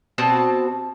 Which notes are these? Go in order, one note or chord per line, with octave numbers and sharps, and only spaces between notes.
B2 C4 A5